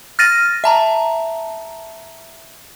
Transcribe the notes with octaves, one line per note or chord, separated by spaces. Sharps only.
F6 A6 A#6 D#7
E5 A5 A#5